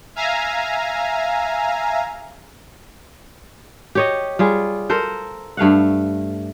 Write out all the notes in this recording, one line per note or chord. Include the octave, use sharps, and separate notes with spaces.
E5 F5 G#5 A#5
G4 C#5 D#5
G3 F4 G#4
A4 A#4 C5
G2 A3 F5 F#5